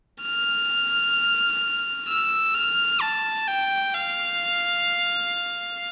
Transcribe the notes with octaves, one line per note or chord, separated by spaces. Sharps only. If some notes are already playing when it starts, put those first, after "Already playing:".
F6
E6
F6
A5
G5
F5